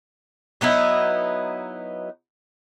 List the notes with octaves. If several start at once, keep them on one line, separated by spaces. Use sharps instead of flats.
F#3 B3 D#4 E4